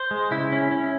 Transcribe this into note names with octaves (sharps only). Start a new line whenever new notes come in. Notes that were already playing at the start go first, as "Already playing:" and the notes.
Already playing: C5
G#3
C#3 E4
C#4
C#4